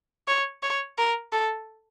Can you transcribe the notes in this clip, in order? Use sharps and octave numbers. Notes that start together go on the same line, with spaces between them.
C#5
C#5
A#4
A4